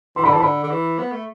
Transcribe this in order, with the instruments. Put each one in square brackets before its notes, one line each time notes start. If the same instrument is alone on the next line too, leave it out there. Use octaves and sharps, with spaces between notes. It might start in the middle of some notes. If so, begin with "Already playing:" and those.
[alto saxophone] E3 [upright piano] C6
[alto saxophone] D3 [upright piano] B5
[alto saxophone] E3 [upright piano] A5
[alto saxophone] D3 [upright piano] B5
[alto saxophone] D3
E3
B3
A3